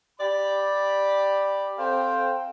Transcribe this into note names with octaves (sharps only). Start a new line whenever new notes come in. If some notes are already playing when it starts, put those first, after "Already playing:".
G4 D5 B5
C4 A4 C5 F5 G5